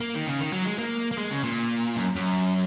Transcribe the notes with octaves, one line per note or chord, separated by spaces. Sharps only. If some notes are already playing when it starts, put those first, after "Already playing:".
A#3
D#3
C#3
D#3
F#3
G#3
A#3
A#3
G#3
C#3
A#2
F#2
F#2